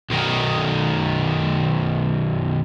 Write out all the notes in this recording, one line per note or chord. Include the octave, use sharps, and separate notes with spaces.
B1 D#3